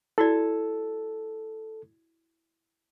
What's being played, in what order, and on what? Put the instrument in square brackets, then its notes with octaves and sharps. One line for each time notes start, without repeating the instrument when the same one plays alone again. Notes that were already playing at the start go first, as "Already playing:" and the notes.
[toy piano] E4 F#4 D5 [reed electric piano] A4